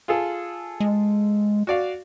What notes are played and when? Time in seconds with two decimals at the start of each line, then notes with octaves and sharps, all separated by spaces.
0.08 F4 G#4 A4
0.80 G#3
1.67 F#4 D5 F5